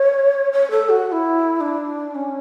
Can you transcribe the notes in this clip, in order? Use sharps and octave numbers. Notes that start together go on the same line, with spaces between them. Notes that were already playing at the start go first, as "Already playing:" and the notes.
Already playing: C#5
C#5
A4
F#4
F#4
E4
D4
C#4